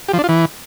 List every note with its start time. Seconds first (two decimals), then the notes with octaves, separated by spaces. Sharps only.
0.08 G4
0.14 F3
0.19 D4
0.24 F4
0.29 E3